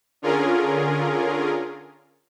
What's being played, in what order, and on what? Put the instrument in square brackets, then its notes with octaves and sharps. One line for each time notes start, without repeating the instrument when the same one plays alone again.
[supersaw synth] D3 C#4 F4 G#4 A#4